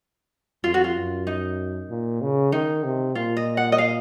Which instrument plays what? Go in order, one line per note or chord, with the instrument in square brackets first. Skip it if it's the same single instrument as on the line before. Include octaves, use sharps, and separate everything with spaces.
[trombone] F2 [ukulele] F4
[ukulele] F#4
F4
[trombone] F#2
[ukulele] D#4
[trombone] A#2
C#3
[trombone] D#3 [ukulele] D#4
[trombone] C3
[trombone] A#2 [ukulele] F4
[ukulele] D#5
F#5
D#5
F5